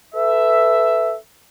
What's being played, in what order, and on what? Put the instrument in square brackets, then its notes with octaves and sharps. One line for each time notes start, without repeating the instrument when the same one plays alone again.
[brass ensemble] A4 B4 E5